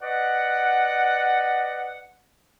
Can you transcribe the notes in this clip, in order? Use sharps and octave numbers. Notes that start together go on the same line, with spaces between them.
B4 D5 D#5 F#5